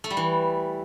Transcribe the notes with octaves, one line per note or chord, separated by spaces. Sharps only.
A3
G3
E3